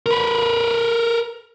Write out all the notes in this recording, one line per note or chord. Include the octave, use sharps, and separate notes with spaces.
A#4 B4